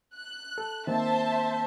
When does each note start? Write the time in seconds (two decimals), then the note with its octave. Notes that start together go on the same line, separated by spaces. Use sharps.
0.14 F#6
0.58 A4
0.87 D#3 A#3 C4 C5 E5 A5